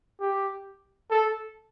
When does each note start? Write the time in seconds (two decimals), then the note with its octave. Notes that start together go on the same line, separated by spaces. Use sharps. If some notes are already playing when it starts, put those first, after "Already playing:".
0.21 G4
1.11 A4